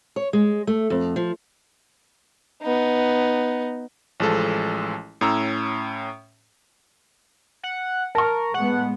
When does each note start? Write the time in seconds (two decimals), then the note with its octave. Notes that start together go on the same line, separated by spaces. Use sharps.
0.16 C#5
0.33 G#3
0.67 A3
0.90 F2
1.16 F3
2.62 B3 D#4
4.20 A1 F3 G#3 A4
5.21 A2 C#4 A#5 E6
7.63 F#5
8.15 A#4 A5 C#6
8.54 A2 G#3 B3 F#5